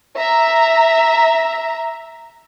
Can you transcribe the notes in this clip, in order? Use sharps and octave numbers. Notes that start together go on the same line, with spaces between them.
E5 A#5